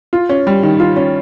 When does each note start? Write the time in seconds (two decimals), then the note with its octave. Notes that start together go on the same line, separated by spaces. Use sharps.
0.13 F4
0.29 C#4
0.47 G3
0.63 D#3
0.80 F4
0.96 C#4